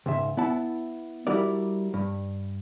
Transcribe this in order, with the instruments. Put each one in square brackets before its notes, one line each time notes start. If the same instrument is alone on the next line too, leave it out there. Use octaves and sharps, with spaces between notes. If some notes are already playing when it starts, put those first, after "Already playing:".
[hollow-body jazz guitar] C#2 G#2 E5
B3 E4 A5
G3 E4 F#4 A#4 D5
G2